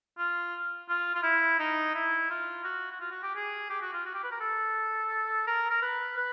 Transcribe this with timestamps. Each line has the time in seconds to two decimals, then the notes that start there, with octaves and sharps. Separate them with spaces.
0.18 F4
0.89 F4
1.15 F4
1.23 E4
1.59 D#4
1.95 E4
2.30 F4
2.64 F#4
2.92 F#4
3.00 F4
3.11 F#4
3.23 G4
3.35 G#4
3.70 G4
3.82 F#4
3.93 F4
4.06 F#4
4.14 G4
4.24 B4
4.32 A#4
4.40 A4
5.47 A#4
5.70 A#4
5.82 B4
6.16 B4